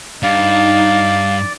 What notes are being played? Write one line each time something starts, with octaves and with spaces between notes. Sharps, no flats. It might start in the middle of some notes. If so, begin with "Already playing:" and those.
G2 D#4 D5 F5